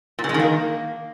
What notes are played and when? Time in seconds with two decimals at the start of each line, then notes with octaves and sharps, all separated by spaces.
0.19 A#2
0.24 C#3
0.29 G#3
0.34 D#3
0.40 A#3